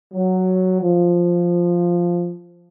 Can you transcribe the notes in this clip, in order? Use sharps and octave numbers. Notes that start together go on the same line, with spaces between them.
F#3
F3